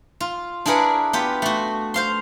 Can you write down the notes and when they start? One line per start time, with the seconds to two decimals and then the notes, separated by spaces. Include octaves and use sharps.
0.21 F4
0.66 D4 E4 G#4 A#4 B4 F#5
1.13 B3 F4 G4 B4
1.42 A3 F#4
1.94 C5 F5 C6